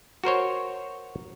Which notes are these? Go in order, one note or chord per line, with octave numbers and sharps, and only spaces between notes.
F#4 A#4 C5 C#5